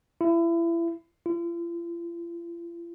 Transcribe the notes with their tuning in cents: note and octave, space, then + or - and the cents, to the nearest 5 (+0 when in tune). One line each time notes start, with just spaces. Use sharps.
E4 +30
F4 -45